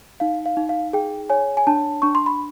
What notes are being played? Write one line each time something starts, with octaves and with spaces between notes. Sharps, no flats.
D#4 F5
F5
D#4
F5
G#4 G5
C#5 G#5
G#5
D4 A5
D4 C#6
C6
B5